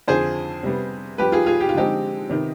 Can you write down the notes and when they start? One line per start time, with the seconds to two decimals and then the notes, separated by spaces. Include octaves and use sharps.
0.08 F2 D3 F3 G#4 C5
0.63 C3 G3 B3
1.18 G2 F3 B3 G4 B4
1.32 F4 G#4
1.46 F4 G#4
1.61 G4
1.69 F4
1.74 D3 F3 G#3 C4 D#4 G4
2.30 C3 D#3 B3